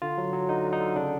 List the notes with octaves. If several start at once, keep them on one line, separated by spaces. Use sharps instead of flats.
D3 F4
F#3
F#3
D3 D#4
D3
D#4
D3
C#3 D4